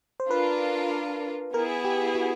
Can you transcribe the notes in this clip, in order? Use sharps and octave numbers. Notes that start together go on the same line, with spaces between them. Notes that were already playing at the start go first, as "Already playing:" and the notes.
C5
D4 F4 A#4 B4
B3 E4 G#4 A#4
G4
F#4